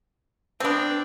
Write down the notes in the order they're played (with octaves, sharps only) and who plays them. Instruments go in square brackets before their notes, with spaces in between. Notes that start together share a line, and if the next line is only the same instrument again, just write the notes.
[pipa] B3 C4 [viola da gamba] D4